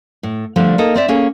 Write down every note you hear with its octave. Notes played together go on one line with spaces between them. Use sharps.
A2
D3 F3 G3 A3
A#3 D#4 A4 D#5
C4 D5 E5
A#3 C#4 G#4 A4